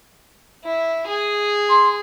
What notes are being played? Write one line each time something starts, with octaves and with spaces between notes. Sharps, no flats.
E4
G#4
C6